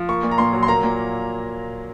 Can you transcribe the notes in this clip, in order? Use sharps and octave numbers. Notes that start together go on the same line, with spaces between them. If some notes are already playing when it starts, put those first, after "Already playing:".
Already playing: F3
A#3 C#6
A#2
A#5
A#2 C6
F#3
C6
A#3 A#5
A#2